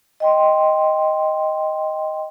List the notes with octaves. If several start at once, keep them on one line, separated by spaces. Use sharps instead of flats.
D#5 G5 C6